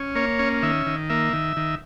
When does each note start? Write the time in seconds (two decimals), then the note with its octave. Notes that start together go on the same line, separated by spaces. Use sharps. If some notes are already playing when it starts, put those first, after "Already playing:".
Already playing: C#4
0.15 A#3 C#5
0.39 C#4
0.63 D#3 E5
0.86 D#3
1.10 A#3 E5
1.33 D#3
1.57 D#3